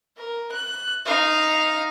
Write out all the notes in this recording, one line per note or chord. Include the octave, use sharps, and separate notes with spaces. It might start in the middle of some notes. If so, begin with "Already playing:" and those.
A#4
F#6
D#4 F5